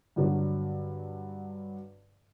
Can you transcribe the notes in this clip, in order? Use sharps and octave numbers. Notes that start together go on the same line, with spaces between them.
G2 D3 F#3